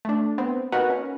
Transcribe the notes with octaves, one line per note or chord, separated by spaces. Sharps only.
A3 D4
B3 C4
A#3 D#4 F#4 A#4 B4 F#5
C#4